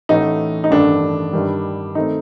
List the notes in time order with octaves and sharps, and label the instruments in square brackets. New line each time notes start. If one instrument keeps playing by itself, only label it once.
[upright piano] A1 A2 A3 D#4
D#4
A1 G2 D#3 A3 D4
G2 D#3 G3
D#3 A3 C4 D#4